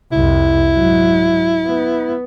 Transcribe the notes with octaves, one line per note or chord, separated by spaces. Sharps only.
C2 F2 E4
G#2 F#3
B3